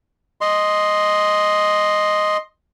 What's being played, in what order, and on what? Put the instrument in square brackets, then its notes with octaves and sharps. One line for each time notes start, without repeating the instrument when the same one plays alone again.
[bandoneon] D#5 C6